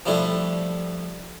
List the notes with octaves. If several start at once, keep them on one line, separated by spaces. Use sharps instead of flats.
F3 G3 A3 D4 E4